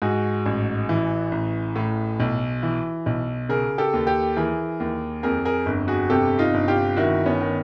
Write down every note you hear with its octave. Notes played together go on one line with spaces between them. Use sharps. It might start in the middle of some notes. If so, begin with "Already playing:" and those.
G#2 F#4 G#4
A1
E3
A1
A2
B1
E3
B1
C#3 G#4 A#4
G4 A4
D#2
G4 A4
E3 G#4 A#4
D#2
F2 G#4 A#4
G#4 A#4
G1
F#4 G#4
C3 G4 A4
D#4 F4
G1
F4 G4
D#3 E4 F#4
B3 C#4
D#3